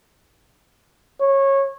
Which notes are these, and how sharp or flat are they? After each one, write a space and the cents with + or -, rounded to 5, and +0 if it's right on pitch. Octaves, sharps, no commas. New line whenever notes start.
C#5 -20